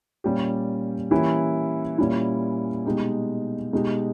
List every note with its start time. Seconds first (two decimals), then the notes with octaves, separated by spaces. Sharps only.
0.24 A#2 G3 C#4 G4
1.11 E3 A#3 C#4 E4 G4
1.98 A#2 G3 C#4 E4
2.86 B2 G#3 D#4 G4
3.73 B2 G#3 D#4 G4